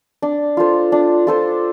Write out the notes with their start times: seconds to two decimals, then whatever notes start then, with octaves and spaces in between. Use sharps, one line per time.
0.22 D4
0.57 F4 A4 C5
0.92 D4
1.27 F4 A4 C5